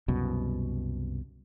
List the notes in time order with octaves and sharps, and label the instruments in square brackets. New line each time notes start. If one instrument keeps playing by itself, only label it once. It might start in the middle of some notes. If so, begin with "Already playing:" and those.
[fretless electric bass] C2 F#2 B2